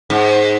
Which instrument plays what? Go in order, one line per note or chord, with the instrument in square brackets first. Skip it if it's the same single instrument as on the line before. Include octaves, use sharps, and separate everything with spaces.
[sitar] G#2